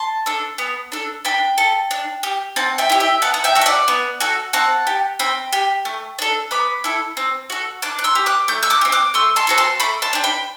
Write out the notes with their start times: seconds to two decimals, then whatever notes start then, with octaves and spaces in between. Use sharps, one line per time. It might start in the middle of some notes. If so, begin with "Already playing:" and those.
Already playing: A5 C6
0.26 D4 A4
0.58 B3
0.92 D4 A4
1.25 D4 G5 B5
1.58 A4
1.91 D4
2.23 G4
2.56 C4 F#5 A5
2.78 E5 G5
2.90 E4 G4
3.00 E5 G5
3.22 B3 F#5 A5
3.34 F#5
3.44 E5 G5
3.55 F#4 A4
3.61 E5
3.66 D5 F#5
3.88 B3
4.20 F#4 A4
4.53 C4 F#5 A5
4.87 G4
5.19 C4 G5 B5
5.53 G4
5.85 A3
6.19 D4 A4
6.51 B3 B5 D6
6.84 E4 A4
7.17 C4
7.50 F#4 A4
7.82 D4 D6 F#6
7.99 F#6
8.04 C6 E6
8.15 G4
8.26 D6 F#6
8.48 A3 G6
8.63 E6 G6
8.70 D6 F#6
8.81 G4
8.85 C4
8.92 D6 F#6
9.14 A3 C6 E6
9.36 A5 C6
9.47 C4 F#4 A4
9.58 A5 C6
9.80 A3 B5 D6
10.02 A5 C6
10.13 D4 G4
10.24 G5 B5